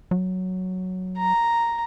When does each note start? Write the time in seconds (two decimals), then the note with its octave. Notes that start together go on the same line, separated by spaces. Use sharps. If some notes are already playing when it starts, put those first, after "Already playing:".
0.11 F#3
1.18 A#5